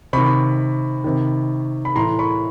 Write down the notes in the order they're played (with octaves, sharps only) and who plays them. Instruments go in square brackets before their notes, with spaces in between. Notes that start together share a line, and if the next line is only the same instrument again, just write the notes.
[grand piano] C3 D#3 B5 C#6
C3 D#3
B5
A2 E3 A#5 C6
B5 C#6